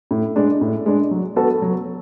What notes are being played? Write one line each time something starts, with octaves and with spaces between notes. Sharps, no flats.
A2
G#3 D4
A2
G#3 D4
F#3
B3 F#4 A4
F#3